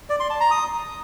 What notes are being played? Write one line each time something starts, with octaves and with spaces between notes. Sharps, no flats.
D5
C6
A5
A#5
D#6